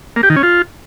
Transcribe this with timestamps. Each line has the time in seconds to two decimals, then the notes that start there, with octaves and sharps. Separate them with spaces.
0.16 A#3
0.23 G4
0.30 D#3
0.36 C#4
0.43 F4